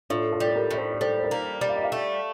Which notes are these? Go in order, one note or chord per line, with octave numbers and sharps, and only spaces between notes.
A2 D4 F4
F4 A4
G3
A4
G4 A#4
A2 D5
A4 C5
D5
G3 A4 C5
C5
A#4 D5
A#3
G3
F5
D#5
D5 F5
A3